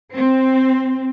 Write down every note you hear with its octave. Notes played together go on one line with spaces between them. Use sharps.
C4